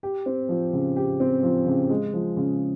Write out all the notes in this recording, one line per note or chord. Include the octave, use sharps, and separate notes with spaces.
G4
C4
F3
C#3
G4
C4
F3
C#3
G#3
F3
C#3